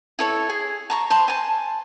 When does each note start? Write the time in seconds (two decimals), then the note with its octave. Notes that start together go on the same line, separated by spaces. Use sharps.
0.19 E4 A4 C#5
0.49 G#4
0.90 A5 A#5 C#6
1.10 C5 A5 B5 C6
1.28 G#5 A5